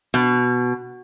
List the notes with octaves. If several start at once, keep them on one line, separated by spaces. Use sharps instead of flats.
B2